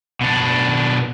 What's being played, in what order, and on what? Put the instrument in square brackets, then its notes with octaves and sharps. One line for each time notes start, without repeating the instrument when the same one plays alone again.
[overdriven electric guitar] B2 D4